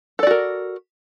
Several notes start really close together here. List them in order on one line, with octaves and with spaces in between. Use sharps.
A4 D5 F#4 A#4